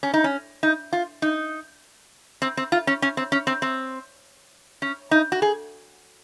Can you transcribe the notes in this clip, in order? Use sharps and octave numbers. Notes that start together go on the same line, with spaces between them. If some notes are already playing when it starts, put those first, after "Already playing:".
C#4
D#4
C#4
D#4
F4
D#4
C4
C4
F4
C#4
C#4
C4
C#4
C4
C4
C#4
D#4
F#4
G#4